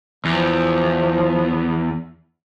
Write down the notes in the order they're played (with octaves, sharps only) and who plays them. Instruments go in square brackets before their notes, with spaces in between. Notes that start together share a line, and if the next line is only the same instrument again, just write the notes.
[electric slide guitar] E2 [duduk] F3